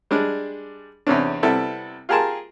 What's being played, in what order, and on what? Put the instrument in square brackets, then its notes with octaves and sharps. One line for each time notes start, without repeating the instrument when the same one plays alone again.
[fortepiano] G3 G#3 D4
E2 C3 C#4 D4
C3 G3 B3 E4 A4
F4 G4 G#4 A#4 A5 C6